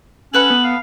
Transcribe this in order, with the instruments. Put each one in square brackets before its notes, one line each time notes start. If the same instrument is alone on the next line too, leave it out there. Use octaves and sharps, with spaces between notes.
[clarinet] C#4 [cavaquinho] A4 B4 F#5 [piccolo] F#7
[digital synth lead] B3
[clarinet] F5